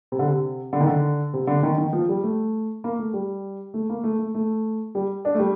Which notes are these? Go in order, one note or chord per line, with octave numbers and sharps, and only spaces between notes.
C3
D3
C3
D3
D#3
D3
C3
D3
D#3
D#3
F3
G3
A3
A#3
A3
G3
A3
A#3
A3
A3
A3
G3
D4
A3
G3